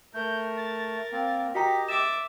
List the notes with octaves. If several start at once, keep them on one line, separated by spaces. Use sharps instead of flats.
A3 A#4 G6
A6
A#3 C4 A6
F#4 G4 D#5 G5 A#5 B6
E5 D6 A6 E7